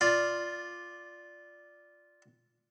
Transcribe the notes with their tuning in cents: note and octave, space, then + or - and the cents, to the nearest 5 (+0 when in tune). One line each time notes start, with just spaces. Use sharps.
F4 +0 D5 +0